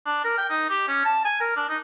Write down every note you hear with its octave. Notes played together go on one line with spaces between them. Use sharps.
D4
A#4
G5
D#4
G4
C#4
A5
G#5
A#4
D4
D#4